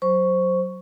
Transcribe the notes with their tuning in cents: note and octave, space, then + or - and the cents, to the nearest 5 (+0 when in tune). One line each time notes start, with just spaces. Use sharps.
F#3 +0 C5 +0 C#6 +0